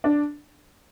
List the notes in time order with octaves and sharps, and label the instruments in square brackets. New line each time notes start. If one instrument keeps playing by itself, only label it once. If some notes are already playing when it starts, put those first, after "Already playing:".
[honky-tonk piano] D4